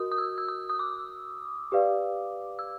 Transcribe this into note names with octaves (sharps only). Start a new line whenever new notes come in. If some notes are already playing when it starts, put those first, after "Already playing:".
Already playing: F#4 A#4 D#5 D#6
D#6
E6
E6
D#6
D#6
D6
G4 B4 D5 F5
E6